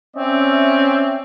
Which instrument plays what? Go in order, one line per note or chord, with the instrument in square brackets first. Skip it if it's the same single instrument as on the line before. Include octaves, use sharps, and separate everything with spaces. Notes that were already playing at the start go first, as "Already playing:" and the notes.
[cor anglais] C4 [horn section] C#4 D5 E5